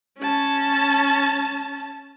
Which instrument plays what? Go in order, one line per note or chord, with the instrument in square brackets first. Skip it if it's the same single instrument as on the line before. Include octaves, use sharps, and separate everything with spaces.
[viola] C#4 A5